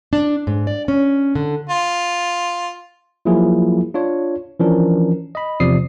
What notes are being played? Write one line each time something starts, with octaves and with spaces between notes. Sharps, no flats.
D4
G#2
D5
C#4
D3
F4
F3 F#3 A#3 E4 F4 G#4
D4 F4 C#5
E3 F3 C#4 D4 A#4
D#5 B5
E2 C3 F3 D5 D#6 C7